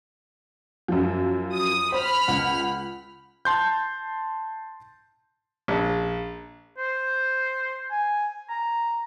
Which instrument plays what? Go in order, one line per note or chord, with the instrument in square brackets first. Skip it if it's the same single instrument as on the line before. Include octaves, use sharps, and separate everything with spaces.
[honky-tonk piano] F#2 F3
[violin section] D#6
[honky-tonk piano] C5 [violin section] B5 F6
[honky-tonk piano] C#2 F#5
[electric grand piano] A5 C6 G6
[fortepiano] A#1
[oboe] C5
G#5
A#5